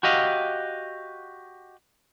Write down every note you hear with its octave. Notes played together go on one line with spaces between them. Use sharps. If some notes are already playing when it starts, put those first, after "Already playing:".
F#4 G4 D#5 F5